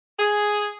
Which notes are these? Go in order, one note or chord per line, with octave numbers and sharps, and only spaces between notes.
G#4